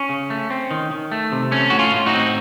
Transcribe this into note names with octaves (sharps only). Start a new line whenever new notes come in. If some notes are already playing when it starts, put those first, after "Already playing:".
Already playing: C#4
C#3
A3
C4
D#3
D#3
A3
C3
A3 C#4
A2 F#4
C#4 F4
A2
D#4 F#4
C4